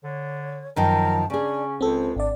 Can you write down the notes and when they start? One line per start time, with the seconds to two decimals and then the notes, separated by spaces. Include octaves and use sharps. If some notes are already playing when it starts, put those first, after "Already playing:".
0.04 D3 C#5
0.76 F#2 D#3 F3 A#4 A5
1.30 C#3 C#4 D4 G#4
1.81 C#2 C4 A4 C5
2.16 G#1 D4 D5